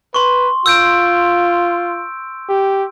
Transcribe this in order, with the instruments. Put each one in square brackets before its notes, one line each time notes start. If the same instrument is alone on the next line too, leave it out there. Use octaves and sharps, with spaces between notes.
[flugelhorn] B4 [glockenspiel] C6 C#6
[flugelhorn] F4 [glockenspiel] E6 G6 D7
[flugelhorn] G4